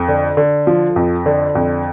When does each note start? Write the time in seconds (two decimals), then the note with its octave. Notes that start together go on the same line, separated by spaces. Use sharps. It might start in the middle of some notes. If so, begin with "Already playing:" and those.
Already playing: F2
0.09 D3
0.37 D3
0.67 F3
0.96 F2
1.26 D3
1.55 F2